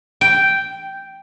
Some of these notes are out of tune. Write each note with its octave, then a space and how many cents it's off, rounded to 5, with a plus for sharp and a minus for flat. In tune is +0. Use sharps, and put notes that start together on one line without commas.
G5 -5